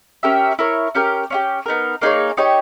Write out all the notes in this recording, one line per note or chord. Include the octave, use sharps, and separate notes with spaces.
C#4 G4 A#4 E5
E4 A#4 C#5
C#4 G4 A#4
C#4 E4 G4
B3 D#4 A#4
A#3 D#4 G#4 C#5
D#4 G4 C#5